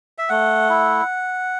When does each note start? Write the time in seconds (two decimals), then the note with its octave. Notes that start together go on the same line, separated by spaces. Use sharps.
0.18 E5
0.29 A3 F#5
0.69 E4